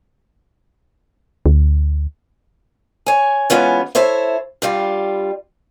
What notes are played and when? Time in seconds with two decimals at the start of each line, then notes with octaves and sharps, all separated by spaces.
1.46 D2
3.06 C#5 G#5
3.50 E3 F#3 G#3 B3 C#4 F4
3.95 E4 A4 C5 C#5 E5
4.62 G2 G3 F4